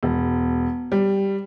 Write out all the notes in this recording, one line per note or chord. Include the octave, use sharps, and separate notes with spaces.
E1
G3